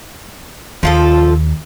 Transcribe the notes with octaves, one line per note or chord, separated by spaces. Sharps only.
D#2 F3 F4 A4